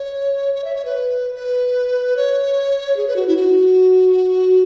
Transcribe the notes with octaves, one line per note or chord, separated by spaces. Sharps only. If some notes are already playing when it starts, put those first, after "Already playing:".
Already playing: C#5
C#5
E5
C#5
B4
B4
C#5
G#4
B4
F#4
E4
F#4